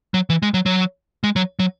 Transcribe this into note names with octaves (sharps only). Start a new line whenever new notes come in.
F#3
E3
G#3
F#3
F#3
G#3
F#3
F#3